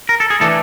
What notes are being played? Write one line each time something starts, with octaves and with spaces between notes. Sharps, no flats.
A#4
A4
G#4
E3 A3 D4 A4